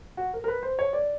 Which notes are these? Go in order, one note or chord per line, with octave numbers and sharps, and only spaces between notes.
F#4
A#4
A#4
B4
C5
C#5
D5